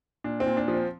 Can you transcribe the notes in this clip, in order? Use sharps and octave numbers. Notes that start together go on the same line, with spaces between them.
A#2 D4
C4
A#2
D4
F3
C4